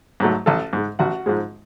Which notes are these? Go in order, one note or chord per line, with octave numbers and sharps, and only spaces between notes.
G#2 F#3 A3
A1 A4 A5
G#2 G#3
A1 F#4 F#5
G#2 F3 G#3